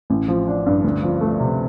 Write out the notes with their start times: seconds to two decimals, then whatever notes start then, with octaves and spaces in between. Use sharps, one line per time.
0.10 A1
0.28 F3
0.48 D4
0.66 G2
0.84 D2
1.03 F3
1.21 A3
1.40 C3